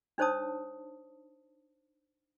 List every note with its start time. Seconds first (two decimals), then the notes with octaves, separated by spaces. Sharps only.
0.18 D4 D#4 C5 C#5 A5 D#6